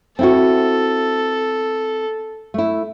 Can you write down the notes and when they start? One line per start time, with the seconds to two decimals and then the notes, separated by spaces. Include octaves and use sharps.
0.19 C4 E4 F#4 A4
2.54 A3 E4